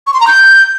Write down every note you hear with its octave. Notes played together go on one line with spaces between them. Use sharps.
C#6
C6
A#5
G6